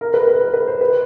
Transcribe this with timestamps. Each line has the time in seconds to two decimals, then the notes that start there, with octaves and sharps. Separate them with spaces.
0.01 A#4
0.14 B4
0.27 B4
0.41 B4
0.54 B4
0.67 C5
0.81 B4